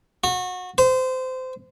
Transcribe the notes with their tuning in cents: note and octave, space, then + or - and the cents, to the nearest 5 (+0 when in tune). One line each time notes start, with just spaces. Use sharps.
F#4 -25
C5 -25